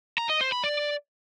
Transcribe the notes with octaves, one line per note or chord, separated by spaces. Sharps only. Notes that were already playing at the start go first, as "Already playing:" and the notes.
A#5
D#5
C5
B5
D5